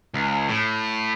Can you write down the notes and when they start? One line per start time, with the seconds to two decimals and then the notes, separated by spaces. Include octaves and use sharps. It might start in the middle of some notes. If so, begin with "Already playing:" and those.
0.14 C#2
0.49 A2